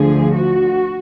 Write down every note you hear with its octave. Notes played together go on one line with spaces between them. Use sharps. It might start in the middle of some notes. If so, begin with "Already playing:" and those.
Already playing: D2 D3 F3 G#4
F#4